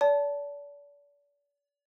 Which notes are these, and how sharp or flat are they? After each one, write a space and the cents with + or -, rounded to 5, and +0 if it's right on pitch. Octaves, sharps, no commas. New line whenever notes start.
D5 -40 A5 +0